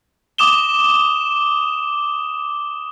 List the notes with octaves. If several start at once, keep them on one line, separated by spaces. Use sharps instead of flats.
D6 D#6 E7 G7